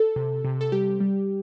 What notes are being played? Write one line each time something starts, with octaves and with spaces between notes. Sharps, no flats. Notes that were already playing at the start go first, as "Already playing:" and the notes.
Already playing: A4
C3
C3
A4
G3 G4
G3